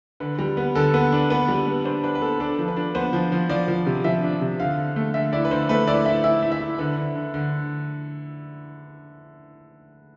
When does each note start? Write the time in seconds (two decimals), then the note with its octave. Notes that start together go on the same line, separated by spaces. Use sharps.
0.20 D3 B4
0.39 G3
0.57 B3
0.75 D3 A4
0.94 B3
1.12 D4
1.30 B3 B4
1.48 G3
1.67 B3
1.85 D4 C5
2.03 D4 B4
2.15 B4
2.22 B3 A4
2.40 D4 A4
2.59 F3
2.68 B4
2.76 D4
2.95 B3 C5
3.13 F3
3.32 F3
3.49 F3 D5
3.68 F3
3.86 C3
4.04 F3 E5
4.23 D4
4.41 C3
4.60 D3 F5
4.78 D3
4.96 A3
5.14 D3 E5
5.33 E4 D5
5.45 B4
5.51 D3 C5
5.69 A3 B4
5.87 E4 D5
6.06 E4 E5
6.24 E4 E5
6.42 E4
6.52 E5
6.61 E4
6.78 D3 B4
6.97 D3
7.15 D3
7.34 D3